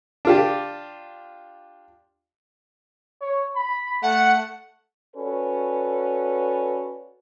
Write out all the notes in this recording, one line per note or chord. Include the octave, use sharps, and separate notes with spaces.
D4 F4 G4
C#5
B5
A3 F#5
C#4 F#4 A4 B4 D5